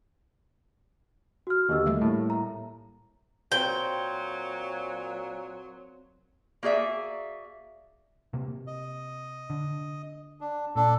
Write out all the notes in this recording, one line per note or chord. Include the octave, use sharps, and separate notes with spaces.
F#4 F6
D#2 D3 G4 D#5 E6
G3 A3 A#3 E5
A2
A#5
A#2 F#3 C4 G5
A#3 F#4 G#4 D5 E5
C3 A#3
D#5
D3
D4
A#2 D4 A4